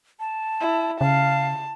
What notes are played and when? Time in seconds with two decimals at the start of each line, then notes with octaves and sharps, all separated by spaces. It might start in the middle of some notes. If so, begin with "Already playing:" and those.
0.20 A5
0.61 E4
1.01 C#3 F5 A5